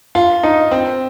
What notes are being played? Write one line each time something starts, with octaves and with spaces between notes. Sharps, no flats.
F4
D#4
C4